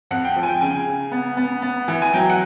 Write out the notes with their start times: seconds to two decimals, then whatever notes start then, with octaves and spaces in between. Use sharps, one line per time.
0.11 F2 F#5
0.24 G5
0.36 F3
0.43 G#5
0.48 G5
0.61 C#3 G#5
0.86 C#3
1.12 B3
1.37 B3
1.62 B3
1.88 E3
2.02 G#5
2.13 F#3 G5
2.30 F#5